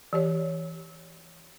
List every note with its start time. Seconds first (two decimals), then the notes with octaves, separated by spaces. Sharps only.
0.13 E3 G4 C#5